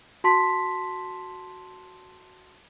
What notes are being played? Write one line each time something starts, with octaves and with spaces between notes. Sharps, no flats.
F#4 A5 C6 B6